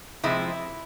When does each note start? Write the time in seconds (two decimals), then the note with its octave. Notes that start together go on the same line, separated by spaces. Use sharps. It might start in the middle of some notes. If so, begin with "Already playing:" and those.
0.23 C3 F3 G#3 E4